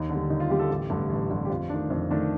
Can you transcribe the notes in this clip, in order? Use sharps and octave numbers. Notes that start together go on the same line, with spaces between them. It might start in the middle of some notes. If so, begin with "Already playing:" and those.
Already playing: D#2 D#4
D3 G3
D#2 D#4
F4
D3 G3 G4
A4
A1 G4
G2 D3 A3
A1
G2 D3 A3
G4
F2 F4
D#3 A3 D4
F2
D#3 A3 D4